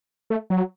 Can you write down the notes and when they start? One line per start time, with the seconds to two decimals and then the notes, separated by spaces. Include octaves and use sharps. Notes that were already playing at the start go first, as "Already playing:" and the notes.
0.30 A3
0.50 F#3